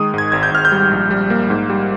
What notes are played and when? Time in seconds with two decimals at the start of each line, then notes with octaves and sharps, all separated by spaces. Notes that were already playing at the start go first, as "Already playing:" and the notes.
Already playing: D#3 G#3 D#6
0.14 G#2 G#6
0.32 G#1 G#6
0.43 G6
0.51 G#1 F6
0.65 G6
0.72 G3
0.91 A#1
1.11 G3
1.30 A#3
1.50 G#2
1.70 G3